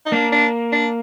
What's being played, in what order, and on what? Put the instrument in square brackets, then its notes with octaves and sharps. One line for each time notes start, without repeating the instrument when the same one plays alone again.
[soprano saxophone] D#4
[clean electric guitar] A#3 [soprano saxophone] D4
[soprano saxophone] D4
D4